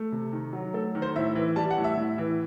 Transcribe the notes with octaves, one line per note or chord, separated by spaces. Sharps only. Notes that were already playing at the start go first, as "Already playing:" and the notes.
Already playing: A3
C3
D#3
F#3
A3 A4
D#3
C5
A2 E5
E3
G3 A5
F#5
A2
E5
A2
E3